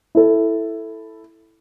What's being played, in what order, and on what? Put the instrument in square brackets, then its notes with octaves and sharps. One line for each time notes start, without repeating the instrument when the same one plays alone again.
[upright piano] E4 A4